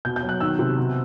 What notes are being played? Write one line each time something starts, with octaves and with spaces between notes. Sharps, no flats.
B2 G6
G6
F#3
F#6
D#3 E6
C3
B2